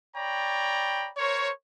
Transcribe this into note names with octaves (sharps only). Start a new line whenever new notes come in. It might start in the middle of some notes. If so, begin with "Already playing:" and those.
C#5 D5 G5 A#5 B5
A#4 C5 C#5